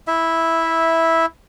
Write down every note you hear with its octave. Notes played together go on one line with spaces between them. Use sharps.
E4 E5